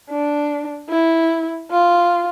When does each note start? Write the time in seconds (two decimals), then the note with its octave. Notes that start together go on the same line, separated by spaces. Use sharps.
0.10 D4
0.90 E4
1.71 F4